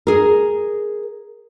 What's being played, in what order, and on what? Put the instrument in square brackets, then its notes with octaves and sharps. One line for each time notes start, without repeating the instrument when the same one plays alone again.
[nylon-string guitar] G#4 A#4